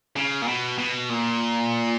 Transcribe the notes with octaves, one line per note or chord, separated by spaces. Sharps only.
C#3
A#2
B2
B2
A#2